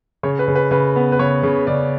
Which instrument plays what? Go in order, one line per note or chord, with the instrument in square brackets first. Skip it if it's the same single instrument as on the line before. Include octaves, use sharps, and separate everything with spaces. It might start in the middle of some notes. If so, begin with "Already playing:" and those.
[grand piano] C#3 C#5
B4
C#3
B4
C#3 B4
B3
B4
C#3 C#5
C#3
C#3 D5